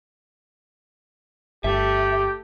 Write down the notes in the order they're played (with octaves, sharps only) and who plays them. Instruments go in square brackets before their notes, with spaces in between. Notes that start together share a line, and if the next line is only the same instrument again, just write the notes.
[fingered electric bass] G1 [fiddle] A3 [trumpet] G4 [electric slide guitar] E5